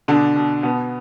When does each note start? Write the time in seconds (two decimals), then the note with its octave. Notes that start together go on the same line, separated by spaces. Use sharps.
0.08 B2 D3 D4
0.36 B2
0.63 B2 B3